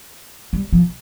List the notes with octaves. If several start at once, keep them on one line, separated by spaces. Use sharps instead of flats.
G3
F3